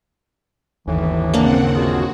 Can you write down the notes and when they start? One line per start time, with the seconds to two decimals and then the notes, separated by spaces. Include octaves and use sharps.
0.87 G1 D#2 A2 E3
1.34 C#3 A#3 C4 D4 A#4 F#5
1.74 C#2 F4 F#4 G#4